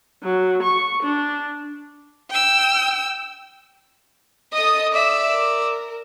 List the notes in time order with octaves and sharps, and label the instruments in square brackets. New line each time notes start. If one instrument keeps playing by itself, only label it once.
[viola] F#3
C#6
D4
[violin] G5 E6
[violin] A4 D#5 [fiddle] D#6
[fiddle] D5 E6 [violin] E5
[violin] A#4